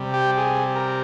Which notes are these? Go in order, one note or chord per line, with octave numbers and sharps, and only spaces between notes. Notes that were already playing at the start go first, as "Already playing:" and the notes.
Already playing: C3 G3
G4
G#4
A#4